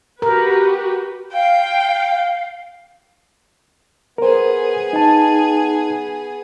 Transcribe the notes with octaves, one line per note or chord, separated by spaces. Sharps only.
F#4 G4 A#4 B4
F5 G5
B3 G#4 A#4 C5
D#4 A5